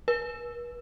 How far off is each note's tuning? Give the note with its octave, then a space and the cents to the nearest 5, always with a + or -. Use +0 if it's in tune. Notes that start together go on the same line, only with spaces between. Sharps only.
B4 -40